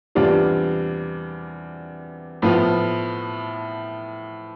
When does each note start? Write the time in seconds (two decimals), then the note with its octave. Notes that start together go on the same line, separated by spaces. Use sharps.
0.15 E2 C3 G3 D4 F4
2.42 A2 F3 B3 F4